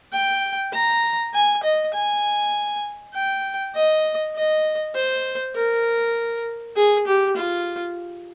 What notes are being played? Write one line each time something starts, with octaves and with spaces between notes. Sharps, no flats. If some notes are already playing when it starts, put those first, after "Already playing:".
G5
A#5
G#5
D#5
G#5
G5
D#5
D#5
C5
A#4
G#4
G4
F4